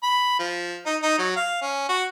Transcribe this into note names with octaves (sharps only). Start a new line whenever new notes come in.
B5
F3
D#4
D#4
F#3
F5
C#4
F#4